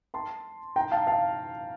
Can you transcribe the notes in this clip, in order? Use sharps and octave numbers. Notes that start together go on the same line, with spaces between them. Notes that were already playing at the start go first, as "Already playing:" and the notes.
A5 C6
G5 A#5
F5 A5
F5 A5